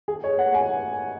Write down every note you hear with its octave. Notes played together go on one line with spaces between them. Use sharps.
G#4
C#5
F#5
G#5